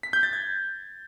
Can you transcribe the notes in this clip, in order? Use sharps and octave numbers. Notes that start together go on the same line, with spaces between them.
B6
G6
A6
G#6